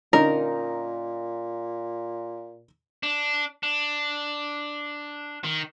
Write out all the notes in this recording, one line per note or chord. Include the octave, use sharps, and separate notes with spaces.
A#2 D3 C#4 D#4 A#4
D4
D4
D#3